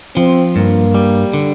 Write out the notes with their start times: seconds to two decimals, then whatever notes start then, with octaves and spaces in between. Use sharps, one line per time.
0.16 F3 C4
0.55 G2 A#3
0.94 G3
1.34 D3